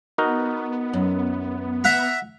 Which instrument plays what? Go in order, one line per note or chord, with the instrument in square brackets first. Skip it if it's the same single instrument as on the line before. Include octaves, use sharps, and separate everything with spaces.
[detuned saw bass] B3 [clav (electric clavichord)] D#4 F#4 A#4
[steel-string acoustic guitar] F#2
[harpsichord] E5 F#5 A#5